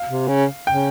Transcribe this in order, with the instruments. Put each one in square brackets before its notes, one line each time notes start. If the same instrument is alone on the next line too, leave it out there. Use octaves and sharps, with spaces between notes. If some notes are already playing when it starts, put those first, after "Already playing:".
Already playing: [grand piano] F5
[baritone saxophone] C3
C#3
[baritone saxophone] C#3 [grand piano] G5